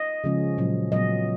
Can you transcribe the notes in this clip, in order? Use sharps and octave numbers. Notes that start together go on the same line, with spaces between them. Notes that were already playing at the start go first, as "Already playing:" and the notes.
Already playing: D#5
C#3 F3 G#3 C#4
A#2 F#3 C#4
A#2 F#3 B3 D#5